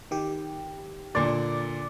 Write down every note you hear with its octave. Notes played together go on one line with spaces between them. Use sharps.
D#3 G4
A#2 D3 D5